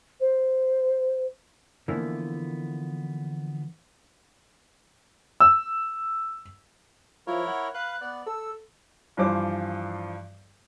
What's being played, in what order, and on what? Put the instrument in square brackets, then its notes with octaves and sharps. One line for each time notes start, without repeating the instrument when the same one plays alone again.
[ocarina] C5
[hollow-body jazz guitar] D3 E3 F3 A#3 B3 E4
[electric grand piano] E6
[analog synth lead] F3 [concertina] E4 A#4 C#5
[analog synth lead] F#5
[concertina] B4 F5 [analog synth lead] F#6
[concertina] B3 D5
[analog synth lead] A4 [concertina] E6
[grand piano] G2 E3 F3 C5 D6